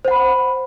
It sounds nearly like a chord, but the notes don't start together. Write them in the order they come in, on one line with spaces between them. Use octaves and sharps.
C5 F#5 B5